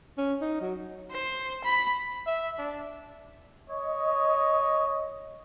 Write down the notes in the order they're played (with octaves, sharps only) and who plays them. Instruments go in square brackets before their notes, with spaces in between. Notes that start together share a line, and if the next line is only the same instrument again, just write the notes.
[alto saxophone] C#4
D#4
F#3
[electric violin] C5
B5
[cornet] E5
D4
[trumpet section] C#5 D#5